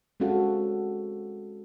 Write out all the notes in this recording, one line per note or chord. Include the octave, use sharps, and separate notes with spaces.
G#3 C4 C#4 F#4 A4 F5